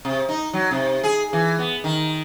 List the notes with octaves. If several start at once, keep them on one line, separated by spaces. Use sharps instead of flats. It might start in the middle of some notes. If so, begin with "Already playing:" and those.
C3
D#4
F#3
C3
G#4
E3
B3
D#3